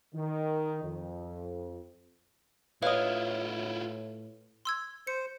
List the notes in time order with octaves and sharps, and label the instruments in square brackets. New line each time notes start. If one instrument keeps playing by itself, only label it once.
[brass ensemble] D#3
F2
[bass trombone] A2 [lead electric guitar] E4 F4 [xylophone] B4 C#5 F6 [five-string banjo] D#5 F5
[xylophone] C6 E6 G#6
[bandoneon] C5 [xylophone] C#7